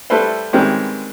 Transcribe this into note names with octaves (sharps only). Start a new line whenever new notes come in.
G3 A3 E4 A4 B4 C5
D#3 E3 G3 G#3 C4 C#4